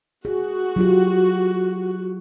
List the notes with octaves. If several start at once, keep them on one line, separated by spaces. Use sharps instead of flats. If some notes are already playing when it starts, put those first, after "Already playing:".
F#4 G#4
F#3 F4 G4